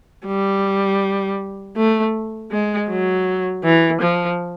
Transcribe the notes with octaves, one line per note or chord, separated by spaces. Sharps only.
G3
A3
G#3
F#3
E3
F3